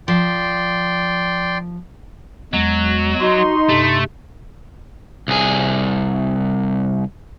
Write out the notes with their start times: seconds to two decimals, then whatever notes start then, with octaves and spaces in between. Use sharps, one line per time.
0.08 F3 D5 G5 C6
2.53 E2 F#3 G#3
3.20 D#4 F#4 C6
3.69 G2 C3 A3
5.28 C2 G#4